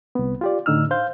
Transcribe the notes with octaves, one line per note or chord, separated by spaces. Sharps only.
C2 B3
F4 G4 D5
A2 D3 D#4 E6 F6
C5 F5 G6